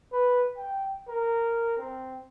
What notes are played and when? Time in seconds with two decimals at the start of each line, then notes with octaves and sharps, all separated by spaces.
0.12 B4
0.57 G5
1.08 A#4
1.78 C4